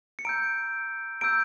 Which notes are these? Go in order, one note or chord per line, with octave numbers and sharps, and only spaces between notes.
C#7
A#5 E6 G6 D7
A#5 E6 G6 D7